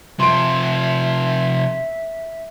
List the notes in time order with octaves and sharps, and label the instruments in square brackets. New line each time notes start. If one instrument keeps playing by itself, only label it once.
[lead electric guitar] C3 F3 [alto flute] E5 [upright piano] C6 D7